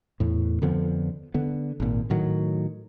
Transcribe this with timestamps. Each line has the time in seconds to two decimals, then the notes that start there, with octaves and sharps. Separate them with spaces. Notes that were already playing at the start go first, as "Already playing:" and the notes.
0.20 E2 A2
0.62 F2 D3 F3 B3
1.34 D3 B3
1.80 G#1 A#2
2.10 A2 D#3 F#3